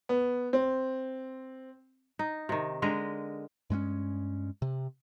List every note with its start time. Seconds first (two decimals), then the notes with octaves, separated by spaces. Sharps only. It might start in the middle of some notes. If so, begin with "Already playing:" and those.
0.09 B3
0.53 C4
2.19 D#4
2.49 C3 D#3
2.82 D3 G#3 A#4 D#5
3.70 G2 G#3 A3 C#4
4.62 C3